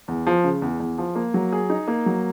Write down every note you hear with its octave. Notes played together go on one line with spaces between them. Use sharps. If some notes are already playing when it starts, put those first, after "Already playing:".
E2
F3
C#3
E2
E2
F3
A#3
F#3
G#4
D#4
A#3
F#3